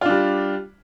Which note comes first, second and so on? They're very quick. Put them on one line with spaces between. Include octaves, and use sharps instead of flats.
F4 D4 G3